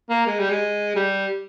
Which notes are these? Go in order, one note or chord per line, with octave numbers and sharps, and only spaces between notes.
A#3
G#3
G3
G#3
G3